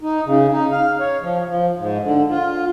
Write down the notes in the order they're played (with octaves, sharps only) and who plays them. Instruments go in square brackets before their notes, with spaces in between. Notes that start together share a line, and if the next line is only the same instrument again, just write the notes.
[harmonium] D#4
C#3
D#4
F5
C#5
F3
F3
G#2
D3
F4